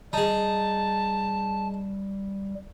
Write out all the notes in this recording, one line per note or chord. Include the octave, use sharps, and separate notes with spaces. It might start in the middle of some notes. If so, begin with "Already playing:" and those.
G3 D#4 G#4 A5